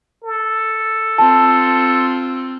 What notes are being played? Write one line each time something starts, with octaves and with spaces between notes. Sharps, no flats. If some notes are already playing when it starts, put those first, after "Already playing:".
A4
C4 F4 A5